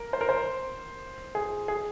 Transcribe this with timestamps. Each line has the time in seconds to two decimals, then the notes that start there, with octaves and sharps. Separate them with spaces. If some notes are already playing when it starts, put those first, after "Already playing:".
Already playing: A#4
0.13 C5
0.21 A#4
0.29 C5
1.35 G#4
1.68 G#4